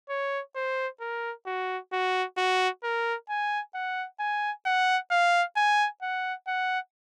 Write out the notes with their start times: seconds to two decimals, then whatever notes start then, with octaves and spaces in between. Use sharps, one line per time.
0.09 C#5
0.56 C5
1.01 A#4
1.46 F#4
1.92 F#4
2.37 F#4
2.83 A#4
3.29 G#5
3.75 F#5
4.20 G#5
4.66 F#5
5.11 F5
5.56 G#5
6.02 F#5
6.47 F#5